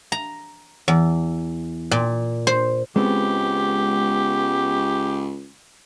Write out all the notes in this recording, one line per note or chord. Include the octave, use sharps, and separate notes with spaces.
A#5
E2
A#2
C5
C#2 G#3 B3 C4 G4